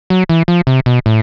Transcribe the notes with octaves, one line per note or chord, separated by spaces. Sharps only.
F#3
E3
F3
C3
B2
A2